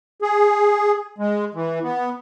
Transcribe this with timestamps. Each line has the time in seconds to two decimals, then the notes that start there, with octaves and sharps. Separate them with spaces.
0.22 G#4
1.18 G#3
1.54 E3
1.83 B3